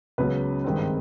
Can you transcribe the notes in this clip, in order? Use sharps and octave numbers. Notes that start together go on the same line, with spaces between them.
C#2 C#3 F#3 B3 B4
G#1 G2 D#3 G#3 C4